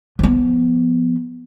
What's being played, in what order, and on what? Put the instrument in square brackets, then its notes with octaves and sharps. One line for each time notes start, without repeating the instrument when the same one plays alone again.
[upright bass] F3 B3